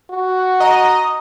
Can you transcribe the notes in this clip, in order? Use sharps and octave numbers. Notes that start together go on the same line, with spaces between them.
F#4
D#5 A#5